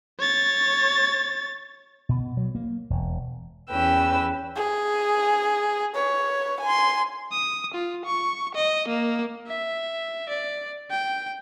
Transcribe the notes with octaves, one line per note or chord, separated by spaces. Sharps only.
C#5 A6
B2
F#3
A#3
E1
E2 C#4 B4 G5 E6
G#4
B4 C#5
G#5 C6
D#6
F4
C#6
D#5
A#3
E5
D5
G5